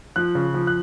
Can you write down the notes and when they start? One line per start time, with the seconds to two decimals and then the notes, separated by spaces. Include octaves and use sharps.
0.16 F3 F#6
0.35 C#3
0.54 F3
0.67 F#6